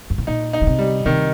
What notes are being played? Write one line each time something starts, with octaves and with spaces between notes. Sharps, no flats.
G2
A2
A#2 D#4
D#4
D3
C3
G3
C3 D#3